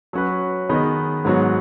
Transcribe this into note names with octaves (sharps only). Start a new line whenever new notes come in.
F#3 C#4 F#4 B4
D#3 B3 G#4 B4 D#5
G#2 F#3 B3 F#4